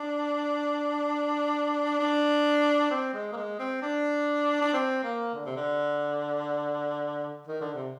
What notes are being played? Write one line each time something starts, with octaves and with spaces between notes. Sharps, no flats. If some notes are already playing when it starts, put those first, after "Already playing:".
Already playing: D4
D4
C4
G#3
A#3
G#3
C4
D4
D4
C4
A#3
D3
C3
D3
D#3
D3
C3